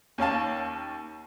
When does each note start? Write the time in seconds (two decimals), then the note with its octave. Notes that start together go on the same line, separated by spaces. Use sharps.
0.18 D#2 C#4 F5 A5